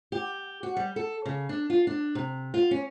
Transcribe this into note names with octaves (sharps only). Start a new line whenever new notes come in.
G4
F#4
G3
A4
C#3
D4
F4
D4
C3
F4
C#4